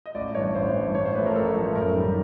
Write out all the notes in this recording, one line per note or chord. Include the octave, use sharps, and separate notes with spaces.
D#5
A1 D5
G2 E3 C#5
A1 C5
E3
G2
A1 C#5
C5
A2 F3 A3 B4
A#4
A1 A4
A2 F3 A3
F#2 A#4
D#3 G3